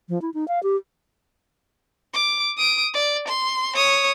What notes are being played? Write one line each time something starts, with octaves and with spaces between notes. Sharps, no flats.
F3
E4
D#4
F5
G4
D6
D#6 D7
D5
C6
C#5 D#6